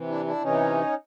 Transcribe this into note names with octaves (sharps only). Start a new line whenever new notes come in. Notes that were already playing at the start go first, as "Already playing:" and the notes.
Already playing: C3 E3
D4 E4
D4 E4
C3 E3 C#4 D#4